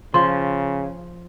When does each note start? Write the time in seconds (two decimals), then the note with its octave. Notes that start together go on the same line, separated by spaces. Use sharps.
0.14 C#3 F3 C6